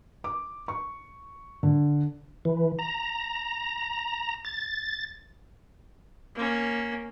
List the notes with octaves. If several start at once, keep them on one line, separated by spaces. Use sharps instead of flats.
D6
C#6
D3
E3
A#5
A6
A#3 C#4